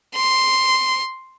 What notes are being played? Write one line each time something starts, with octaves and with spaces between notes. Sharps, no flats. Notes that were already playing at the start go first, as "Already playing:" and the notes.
C6